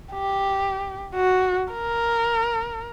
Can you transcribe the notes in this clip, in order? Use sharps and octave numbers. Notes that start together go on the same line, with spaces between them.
G4
F#4
A#4